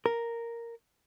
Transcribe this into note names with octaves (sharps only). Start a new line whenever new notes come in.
A#4